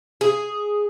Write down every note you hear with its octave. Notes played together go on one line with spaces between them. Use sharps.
G#4